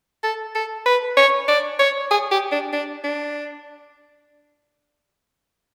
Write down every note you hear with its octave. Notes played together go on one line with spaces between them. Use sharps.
A4
A4
B4
C#5
D5
C#5
G#4
G4
D4
D4
D4